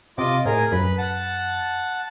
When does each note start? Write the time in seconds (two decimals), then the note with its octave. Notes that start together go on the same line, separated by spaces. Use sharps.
0.18 C3 F4 D#5 D6
0.45 A2 G#4 A#4
0.72 F#2 B4 B5
0.98 F#5 A5